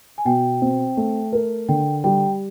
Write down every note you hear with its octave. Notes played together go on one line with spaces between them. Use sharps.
G#5
B2 G5
C4
A3
A#4
D3 G5
G3 G5